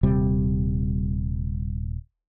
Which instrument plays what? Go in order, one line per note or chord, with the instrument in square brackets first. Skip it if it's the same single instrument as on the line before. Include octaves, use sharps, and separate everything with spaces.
[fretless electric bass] D#1 C3 G3